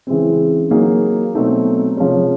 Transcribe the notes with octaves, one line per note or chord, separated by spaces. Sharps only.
C#3 E3 G#3 C4
F#3 A#3 D#4 G#4
B2 F#3 A3 C4 D#4
C3 F3 G#3 C#4